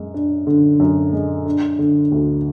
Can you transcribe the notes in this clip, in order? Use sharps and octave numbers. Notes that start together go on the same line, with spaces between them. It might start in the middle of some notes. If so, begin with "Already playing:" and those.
Already playing: F#2 G#3
D4
D3
F#2
G#3
D4
D3
D2